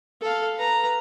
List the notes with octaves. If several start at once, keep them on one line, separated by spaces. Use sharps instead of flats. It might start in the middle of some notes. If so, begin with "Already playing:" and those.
A4 F5
B4 A#5